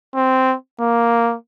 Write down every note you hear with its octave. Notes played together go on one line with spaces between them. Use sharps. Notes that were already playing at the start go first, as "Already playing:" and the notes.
C4
A#3